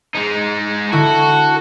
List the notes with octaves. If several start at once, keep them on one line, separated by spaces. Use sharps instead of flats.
G#3 D#4
D3 E4 F#4 A4